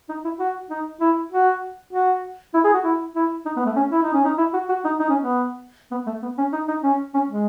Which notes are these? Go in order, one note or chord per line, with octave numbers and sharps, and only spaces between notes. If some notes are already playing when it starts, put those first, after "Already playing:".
D#4
E4
F#4
D#4
E4
F#4
F#4
E4
G#4
F#4
E4
E4
D#4
B3
A3
C#4
E4
D#4
C#4
D#4
E4
F#4
F#4
D#4
D#4
C#4
B3
B3
A3
B3
C#4
D#4
D#4
C#4
C#4
G#3